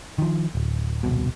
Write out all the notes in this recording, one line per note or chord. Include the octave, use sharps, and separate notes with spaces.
D#3 F3
D1
D#1 C2 B2